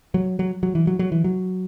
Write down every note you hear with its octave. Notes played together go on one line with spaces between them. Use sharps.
F#3
F#3
F#3
E3
F#3
F#3
E3
F#3